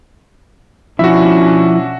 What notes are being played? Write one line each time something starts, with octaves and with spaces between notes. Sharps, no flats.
B2 F3 C#4 D4 E4 F#4 E5